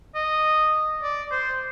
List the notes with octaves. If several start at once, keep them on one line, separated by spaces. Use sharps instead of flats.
D#5
D5
C5